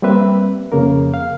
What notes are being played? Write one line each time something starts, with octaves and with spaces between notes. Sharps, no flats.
G3 A#3 C4 B4 E5
F2 C#3 A#3 A#4
F5